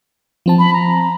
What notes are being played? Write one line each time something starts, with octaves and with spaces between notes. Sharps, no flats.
F3 C4 A5
B5
A#5